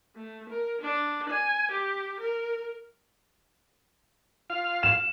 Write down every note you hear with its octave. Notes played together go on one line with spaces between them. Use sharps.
A3
A#4
D4
G#5
G4
A#4
F4 F5 F6
E7